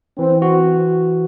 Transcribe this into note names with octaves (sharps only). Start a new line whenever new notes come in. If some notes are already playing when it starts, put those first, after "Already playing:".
E3 C4
F#4